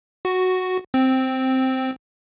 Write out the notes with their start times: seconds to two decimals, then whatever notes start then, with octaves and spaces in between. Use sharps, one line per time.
0.25 F#4
0.94 C4